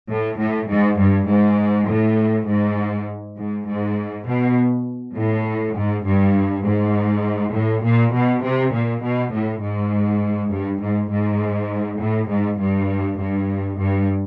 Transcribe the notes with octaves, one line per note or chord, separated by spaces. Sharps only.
A2
A2
G#2
G2
G#2
A2
G#2
G#2
G#2
B2
A2
G#2
G2
G#2
A2
A#2
B2
C3
A#2
B2
A2
G#2
G2
G#2
G#2
A2
G#2
G2
G2
G2